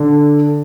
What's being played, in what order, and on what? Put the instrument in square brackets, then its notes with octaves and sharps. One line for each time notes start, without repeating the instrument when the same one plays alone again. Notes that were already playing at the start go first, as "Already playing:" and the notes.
Already playing: [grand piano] D3